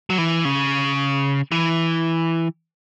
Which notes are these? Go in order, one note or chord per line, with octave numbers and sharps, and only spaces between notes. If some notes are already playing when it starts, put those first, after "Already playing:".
F#3
E3
C#3
E3